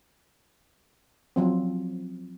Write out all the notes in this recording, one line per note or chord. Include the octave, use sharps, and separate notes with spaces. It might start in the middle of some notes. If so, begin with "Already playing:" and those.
F3 F#3 C4